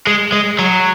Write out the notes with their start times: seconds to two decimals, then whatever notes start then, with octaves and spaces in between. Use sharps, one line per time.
0.07 G#3
0.32 G#3
0.59 F#3